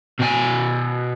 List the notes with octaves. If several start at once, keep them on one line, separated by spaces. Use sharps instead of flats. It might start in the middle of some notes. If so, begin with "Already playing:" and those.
B2 G#5